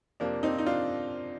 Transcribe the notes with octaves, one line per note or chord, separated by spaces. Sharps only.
F2 C3 F3 A#3 D4
C4 D#4
D#4
D4 F4